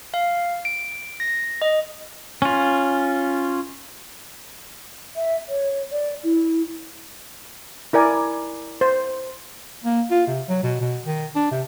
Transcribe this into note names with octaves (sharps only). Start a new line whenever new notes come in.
F5
D7
A#6
D#5
C#4 F4
E5
C#5
D5
E4
E4 A#4 D5 G#5
C5
A#3
F4
C3
F#3
B2
B2
D#3
D4
C3